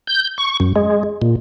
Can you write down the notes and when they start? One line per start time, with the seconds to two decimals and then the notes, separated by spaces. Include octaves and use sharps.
0.07 G6
0.38 C#6
0.60 F#2
0.76 G#3
1.22 A#2